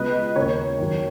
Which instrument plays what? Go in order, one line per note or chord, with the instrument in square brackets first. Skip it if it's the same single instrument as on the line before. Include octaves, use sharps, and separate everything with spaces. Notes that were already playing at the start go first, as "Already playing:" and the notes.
Already playing: [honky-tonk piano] C#2 B2 B4 D#5
D#2 C#3 A#4 C#5
F#2 D#3